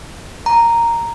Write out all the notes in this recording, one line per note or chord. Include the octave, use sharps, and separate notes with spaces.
A#5